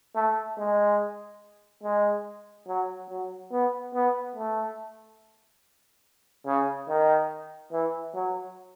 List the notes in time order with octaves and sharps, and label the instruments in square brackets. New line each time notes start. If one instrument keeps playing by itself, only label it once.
[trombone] A3
G#3
G#3
F#3
F#3
B3
B3
A3
C#3
D#3
E3
F#3